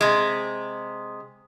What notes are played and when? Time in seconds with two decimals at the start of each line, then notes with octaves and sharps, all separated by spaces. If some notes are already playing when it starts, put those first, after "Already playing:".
0.01 C3 G#3